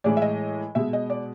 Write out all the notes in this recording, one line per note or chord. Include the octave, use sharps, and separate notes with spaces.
A2 E3 G#3 D5
E5
D#5
B2 G#3 E5
D#5
D5